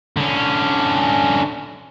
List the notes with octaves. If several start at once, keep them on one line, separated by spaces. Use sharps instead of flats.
D3 C#4